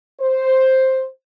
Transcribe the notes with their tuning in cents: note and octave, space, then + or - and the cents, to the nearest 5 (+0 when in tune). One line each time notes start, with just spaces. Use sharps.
C5 +5